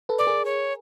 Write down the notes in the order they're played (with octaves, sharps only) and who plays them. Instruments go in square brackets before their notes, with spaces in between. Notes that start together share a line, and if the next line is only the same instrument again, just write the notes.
[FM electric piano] A4 B4
[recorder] D5
[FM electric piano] G#4 A#4
[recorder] C#5